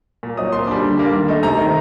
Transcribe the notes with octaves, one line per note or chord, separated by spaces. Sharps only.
A#2
F#3 C4 D#4 D#6
A#2 C6
G3 D4
D3
G3 A#3 D4
D#3
A3 D#4
C3 A#5
D#3 A3 D#4